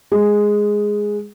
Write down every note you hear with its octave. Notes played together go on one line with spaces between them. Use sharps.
G#3